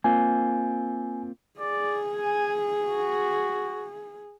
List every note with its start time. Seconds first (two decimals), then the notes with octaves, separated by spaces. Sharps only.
0.04 A#3 C4 F4 G#5
1.60 G#4 D5
2.14 G#5
2.80 F#4